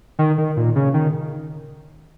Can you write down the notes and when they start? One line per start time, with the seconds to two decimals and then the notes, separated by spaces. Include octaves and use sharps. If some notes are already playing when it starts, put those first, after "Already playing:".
0.19 D#3
0.38 D#3
0.57 A#2
0.76 C#3
0.94 D#3